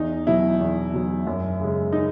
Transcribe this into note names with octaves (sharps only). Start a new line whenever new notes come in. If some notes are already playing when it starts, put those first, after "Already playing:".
Already playing: E2 D#4
B2 F#3 E4
E2
B2 F#3
F#2
C#3 G#3
D#4